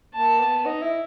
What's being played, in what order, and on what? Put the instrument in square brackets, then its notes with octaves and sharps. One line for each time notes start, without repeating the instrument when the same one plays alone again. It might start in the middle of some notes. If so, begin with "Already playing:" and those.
[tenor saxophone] A#3 [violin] A5
[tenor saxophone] B3
D#4
E4